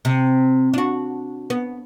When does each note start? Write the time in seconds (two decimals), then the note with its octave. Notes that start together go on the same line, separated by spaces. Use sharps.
0.05 C3
0.74 D4 F#4
1.50 B3